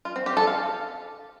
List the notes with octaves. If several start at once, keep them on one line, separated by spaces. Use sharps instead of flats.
F4
C4
G4
A4
F5